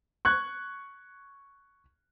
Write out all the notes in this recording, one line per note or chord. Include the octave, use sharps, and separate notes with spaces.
C#6 F#6 G#6